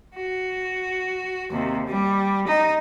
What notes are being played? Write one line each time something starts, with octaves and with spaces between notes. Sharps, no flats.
F#4
D#2 C3
G3
D#4